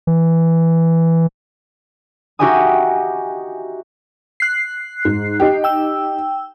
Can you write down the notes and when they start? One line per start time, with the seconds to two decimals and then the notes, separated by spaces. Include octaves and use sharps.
0.07 E3
2.39 D#4 F#4 G4 E5 G#5 D#6
4.40 F#6 C7
5.05 G#2
5.40 D#4 G4
5.64 G5 E6